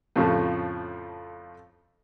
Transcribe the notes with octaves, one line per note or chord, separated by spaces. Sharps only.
F2 A2 C#3 F3 A3